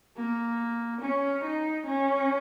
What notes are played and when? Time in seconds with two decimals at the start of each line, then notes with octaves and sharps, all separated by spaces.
0.17 A#3
1.01 C#4
1.44 D#4
1.86 C#4